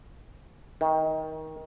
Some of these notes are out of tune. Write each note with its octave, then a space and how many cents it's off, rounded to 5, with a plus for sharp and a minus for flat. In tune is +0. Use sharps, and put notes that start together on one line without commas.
D#3 +20